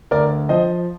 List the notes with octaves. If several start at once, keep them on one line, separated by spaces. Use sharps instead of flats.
D2 A#4 D5
F3 C5 D#5